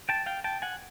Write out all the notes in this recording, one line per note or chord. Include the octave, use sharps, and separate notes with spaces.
G5 A5
F5 G5
G5 A5
F#5 G#5